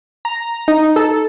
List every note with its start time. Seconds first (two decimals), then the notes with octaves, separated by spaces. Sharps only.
0.25 A#5
0.68 D#4
0.96 A4